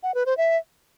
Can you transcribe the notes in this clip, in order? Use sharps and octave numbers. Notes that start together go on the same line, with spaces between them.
F#5
B4
C5
E5